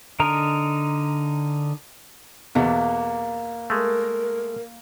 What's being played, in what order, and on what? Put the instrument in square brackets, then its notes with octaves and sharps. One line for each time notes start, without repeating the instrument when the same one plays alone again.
[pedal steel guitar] D3 D#4 A#4 A#5
[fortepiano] E2 B2 [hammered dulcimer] A#3
[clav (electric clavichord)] G#3 A3 [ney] A#4